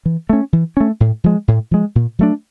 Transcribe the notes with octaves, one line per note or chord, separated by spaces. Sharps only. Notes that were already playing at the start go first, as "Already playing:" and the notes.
E3
A3 C#4
E3
A3 C#4
A2
F3 G#3
A2
F3 G#3
A#2
F#3 A3 D4